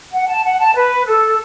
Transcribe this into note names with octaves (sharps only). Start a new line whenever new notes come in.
F#5
A5
F#5
A5
B4
A4